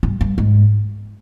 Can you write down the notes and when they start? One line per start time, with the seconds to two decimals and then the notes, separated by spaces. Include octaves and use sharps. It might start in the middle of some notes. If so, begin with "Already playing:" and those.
0.03 G2
0.21 G2
0.38 G#2